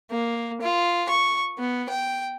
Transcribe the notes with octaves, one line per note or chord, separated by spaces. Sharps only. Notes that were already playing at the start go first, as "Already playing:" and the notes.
A#3
F4
C#6
B3
G5